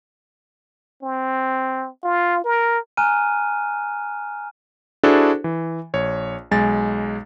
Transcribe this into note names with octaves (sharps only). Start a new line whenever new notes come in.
C4
F4
A#4
G#5 A#5 F6 F#6 D#7
D4 E4 F#4 G#4 A4 C5
E3
A#1 C#5
B1 G#3 G#5 A6